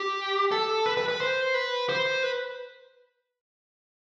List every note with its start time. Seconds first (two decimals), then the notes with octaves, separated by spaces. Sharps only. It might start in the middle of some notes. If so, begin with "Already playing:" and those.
Already playing: G4
0.51 A4
0.86 B4
0.97 B4
1.08 B4
1.20 C5
1.54 B4
1.89 C5
2.23 B4